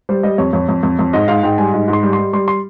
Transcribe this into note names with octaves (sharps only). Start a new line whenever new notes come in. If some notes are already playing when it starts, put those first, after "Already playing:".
G3 C5
G3 D#5
F2 C#5
F2 C#5
F2
F2
F2
G#2 D#5
G#2 F5
G#2 G5
G3 G#5
G#2
G#2
C6
G3
C6
G3
G3 C6
C6